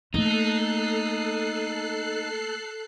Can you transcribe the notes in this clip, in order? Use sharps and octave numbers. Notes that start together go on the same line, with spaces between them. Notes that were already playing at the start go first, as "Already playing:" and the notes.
A3 A#3 D#4 A4 F#6 C7